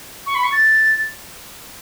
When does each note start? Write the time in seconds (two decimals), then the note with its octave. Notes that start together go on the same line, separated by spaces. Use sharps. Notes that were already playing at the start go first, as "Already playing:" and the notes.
0.26 C#6
0.35 B5
0.44 C#6
0.52 A6